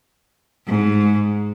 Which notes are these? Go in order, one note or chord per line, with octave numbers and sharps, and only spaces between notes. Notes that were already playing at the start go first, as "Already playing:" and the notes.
G#2